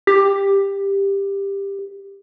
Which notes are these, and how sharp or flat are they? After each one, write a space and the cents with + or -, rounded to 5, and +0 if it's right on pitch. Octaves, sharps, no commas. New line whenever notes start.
G4 +15